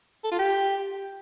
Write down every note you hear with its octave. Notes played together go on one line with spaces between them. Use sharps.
A4
F4
G4